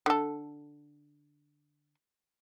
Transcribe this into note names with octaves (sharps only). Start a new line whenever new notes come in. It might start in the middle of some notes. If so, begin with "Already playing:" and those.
D3 A4